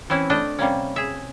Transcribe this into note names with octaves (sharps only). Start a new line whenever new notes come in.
E3 C4 C#4 E4
A3 D4 D#5
C3 G3 A#3 C#4
G#4 E5